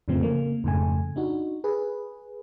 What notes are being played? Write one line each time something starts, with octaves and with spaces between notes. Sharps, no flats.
F2 A2 C#3 F3 A3 C4
C#3 A#3
F2 G#2 C#3 A3 G#5
D4 D#4 F#4
G#4 B4